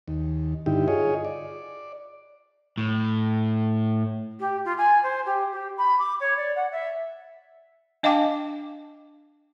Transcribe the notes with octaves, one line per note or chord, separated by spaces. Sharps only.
D#2
G2 D3 D#4 E4 G4
F4 G#4 C#5 D#5
D5
A2
G4
F4
G#5
C5
G4
G4
B5
D6
C#5
D5
F#5
E5
D4 D#5 F5 G5 A5 D6